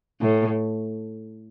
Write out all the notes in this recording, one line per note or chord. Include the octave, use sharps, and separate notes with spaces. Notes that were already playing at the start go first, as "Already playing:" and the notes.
A2